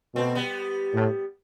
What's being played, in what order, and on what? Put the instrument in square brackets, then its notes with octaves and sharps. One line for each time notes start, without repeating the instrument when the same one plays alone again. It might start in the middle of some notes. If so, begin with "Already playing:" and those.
[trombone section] B2 [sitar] A3 C4
[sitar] G3 B3
[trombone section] A2